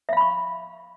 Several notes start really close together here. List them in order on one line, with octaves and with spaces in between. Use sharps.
E5 F5 B5 C#6